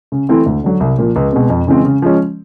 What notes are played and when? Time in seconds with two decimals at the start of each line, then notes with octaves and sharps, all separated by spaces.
0.12 C#3
0.29 E3 A3 C4 E4
0.46 D2
0.64 D3 F#3
0.80 C2
0.98 A#2 F3
1.16 C#2
1.33 B2 G#3 C4
1.50 F2
1.67 C#3 E3 G#3 C4
1.85 C#3
2.02 F3 G#3 C#4